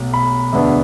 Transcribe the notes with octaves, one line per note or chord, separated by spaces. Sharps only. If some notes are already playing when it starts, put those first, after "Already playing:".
Already playing: B1 B2 A3
B5
E1 D2 D3 B3 D4 E5